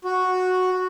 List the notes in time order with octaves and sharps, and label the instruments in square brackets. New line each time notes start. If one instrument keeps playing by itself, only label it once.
[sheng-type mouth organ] F#4